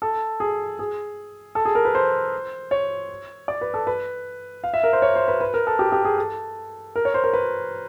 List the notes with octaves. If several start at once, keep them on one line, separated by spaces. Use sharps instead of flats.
A4
G#4
G#4
A4
G#4
A#4
B4
C5
C#5
D5
B4
A4
B4
F5
E5
A#4
C5
C#5
C5
B4
B4
A#4
A4
G4
G4
G#4
A4
A#4
C#5
C5
A#4
B4